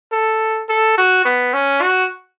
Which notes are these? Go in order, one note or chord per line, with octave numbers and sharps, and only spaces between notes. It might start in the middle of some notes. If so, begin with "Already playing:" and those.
A4
A4
F#4
B3
C#4
F#4